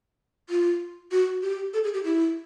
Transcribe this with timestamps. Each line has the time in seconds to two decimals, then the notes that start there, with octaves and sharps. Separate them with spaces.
0.49 F4
1.12 F#4
1.42 G4
1.74 A4
1.84 G#4
1.94 G4
2.04 E4